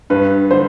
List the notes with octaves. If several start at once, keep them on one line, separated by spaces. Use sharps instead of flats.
G2 B4
D3 C5